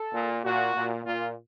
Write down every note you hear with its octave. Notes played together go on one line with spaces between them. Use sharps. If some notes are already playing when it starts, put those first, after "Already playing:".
Already playing: A4
A#2
A#2 F#4
A#2
A#2 F4